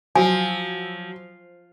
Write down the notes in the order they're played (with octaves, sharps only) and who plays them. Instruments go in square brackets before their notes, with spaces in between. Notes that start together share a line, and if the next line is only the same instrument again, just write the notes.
[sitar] F3 [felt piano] F#3 [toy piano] G#5